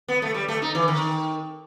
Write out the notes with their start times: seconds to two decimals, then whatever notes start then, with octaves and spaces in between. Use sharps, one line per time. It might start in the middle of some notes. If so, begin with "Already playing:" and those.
0.08 B3
0.22 A3
0.34 G3
0.48 A3
0.62 D#4
0.75 E3
0.88 D#3